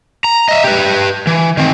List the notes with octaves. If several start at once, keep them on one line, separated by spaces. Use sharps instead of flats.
A#5
D#5 E5
G4 B4
E3
D#3 C4